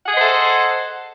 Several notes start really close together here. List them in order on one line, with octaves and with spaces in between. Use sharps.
F#5 G#4 D#5 C5 A4